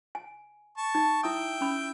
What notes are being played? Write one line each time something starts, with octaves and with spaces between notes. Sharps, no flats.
G#5
A5 C#6
D#4
E4 E5 G5 D#6
C#4 B5